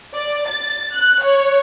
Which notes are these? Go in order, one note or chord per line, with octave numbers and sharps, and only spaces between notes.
D5
A6
F#6
C#5